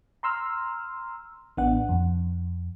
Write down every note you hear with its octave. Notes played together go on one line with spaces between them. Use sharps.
A#5 C6 E6 F6
A1 B3 D4 F#5
F2